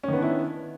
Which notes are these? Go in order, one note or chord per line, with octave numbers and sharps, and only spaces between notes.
D#3 B3 C#4 D4 E4